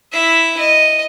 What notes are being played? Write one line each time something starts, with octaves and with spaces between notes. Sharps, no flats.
E4 E5
D#5